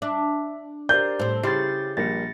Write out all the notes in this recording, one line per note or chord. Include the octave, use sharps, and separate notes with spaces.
D4 E5
G4 A#4 C5 D5 G6
A2 C4 C5
C#3 E4 G4 B5 C6 A6
A#1 G3 A#3 A6 A#6 C#7